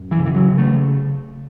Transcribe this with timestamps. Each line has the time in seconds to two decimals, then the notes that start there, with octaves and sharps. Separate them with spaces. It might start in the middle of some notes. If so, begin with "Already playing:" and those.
Already playing: F#2
0.11 E3
0.18 C#3
0.25 E3
0.35 F#3
0.49 C#3
0.58 A3